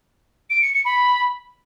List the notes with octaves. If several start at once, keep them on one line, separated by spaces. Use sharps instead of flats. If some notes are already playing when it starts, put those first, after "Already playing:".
D7
C#7
C#7
B5